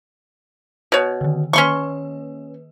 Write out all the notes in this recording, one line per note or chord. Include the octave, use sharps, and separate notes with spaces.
B2 C#5
D3 D#3
D#3 A#3 C#4 B4 C6 C#6